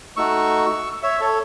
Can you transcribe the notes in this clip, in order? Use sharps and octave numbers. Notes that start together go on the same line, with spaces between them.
A3 D#4 F#4 C#6 E6
C#5 E5
A4 C#5